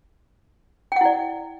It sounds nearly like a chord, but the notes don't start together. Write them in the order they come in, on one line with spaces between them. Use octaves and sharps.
G5 F#5 E4 D5